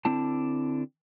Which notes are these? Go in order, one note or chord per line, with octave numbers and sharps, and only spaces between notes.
D3 C4 D4 E4 A5